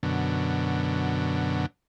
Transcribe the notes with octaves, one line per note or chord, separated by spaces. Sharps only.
F#2 B2 D3